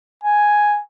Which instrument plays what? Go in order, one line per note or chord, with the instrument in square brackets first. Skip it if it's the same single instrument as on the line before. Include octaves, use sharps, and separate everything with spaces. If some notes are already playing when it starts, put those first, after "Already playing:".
[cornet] G#5